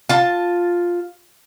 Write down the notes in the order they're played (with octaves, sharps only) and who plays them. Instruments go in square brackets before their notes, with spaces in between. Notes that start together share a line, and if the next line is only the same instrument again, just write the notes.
[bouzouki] F4 A5